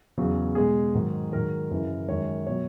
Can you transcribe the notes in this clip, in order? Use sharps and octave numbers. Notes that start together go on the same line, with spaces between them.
E2 C#3 F#3
B2 G#3 G#4
G#2 D#3 F#3
G#2 D#3 F#3 A#4
F#2 C#3 E3
F#2 D#3 G#3 C#5
B2 F#3 C#5